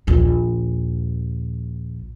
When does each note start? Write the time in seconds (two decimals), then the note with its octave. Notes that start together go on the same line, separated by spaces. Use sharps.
0.07 A#1 D#2